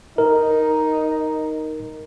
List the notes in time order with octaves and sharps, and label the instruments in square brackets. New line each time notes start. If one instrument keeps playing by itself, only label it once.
[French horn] D#4 [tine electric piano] A#4